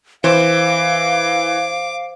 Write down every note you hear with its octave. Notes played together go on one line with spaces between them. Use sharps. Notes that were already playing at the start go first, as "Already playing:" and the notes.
E3 C5 F5 D6